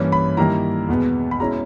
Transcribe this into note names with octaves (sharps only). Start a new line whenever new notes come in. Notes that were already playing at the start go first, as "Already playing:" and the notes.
Already playing: G2 E3 A#3 C#4
B5
G2 D#3 G3 A#3 E4 A#5
E2 B2 G#3 B3
B5
B2 G#3 C#4 E4 A#5